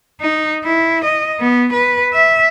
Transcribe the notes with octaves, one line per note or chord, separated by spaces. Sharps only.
D#4
E4
D#5
B3
B4
E5